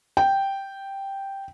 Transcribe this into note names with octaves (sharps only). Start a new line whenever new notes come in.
G5